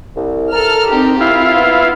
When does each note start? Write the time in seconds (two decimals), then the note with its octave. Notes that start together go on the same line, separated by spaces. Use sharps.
0.16 C2
0.52 A4 A#4 F6
0.90 C4 D#4 G4
1.21 E4 F4 F5
1.56 B3